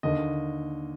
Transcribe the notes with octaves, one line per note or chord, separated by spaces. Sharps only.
D#2 D3 D#5